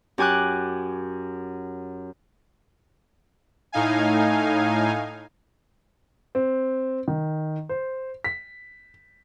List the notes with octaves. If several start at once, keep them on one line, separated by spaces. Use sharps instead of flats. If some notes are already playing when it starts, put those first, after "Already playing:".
F#2 G4 G#5 D6 F#6
A2 D#4 F5 G#5
C4
D#3
C5
B6